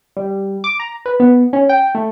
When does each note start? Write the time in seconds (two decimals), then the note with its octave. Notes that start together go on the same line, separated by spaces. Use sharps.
0.17 G3
0.64 D6
0.80 A#5
1.06 B4
1.20 B3
1.53 C#4
1.69 G5
1.95 A3